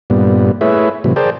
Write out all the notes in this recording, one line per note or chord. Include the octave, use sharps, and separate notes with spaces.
G2 A#2 G3 B3
A3 E4 G#4 B4 C#5 E5
A2 C3 E3 F#3
G#4 A#4 C5 D5 G5 A5